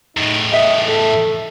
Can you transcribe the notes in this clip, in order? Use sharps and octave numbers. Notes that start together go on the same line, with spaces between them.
E2 A2 D#4
B4 D#5 E5 G5
A4 E5